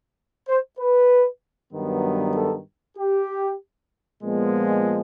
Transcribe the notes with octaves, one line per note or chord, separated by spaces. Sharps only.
C5
B4
G2 D#3 F#3 B3
A4
G4
A#2 F3 G#3 B3